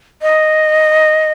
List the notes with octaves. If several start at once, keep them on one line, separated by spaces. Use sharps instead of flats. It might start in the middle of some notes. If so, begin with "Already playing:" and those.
D#5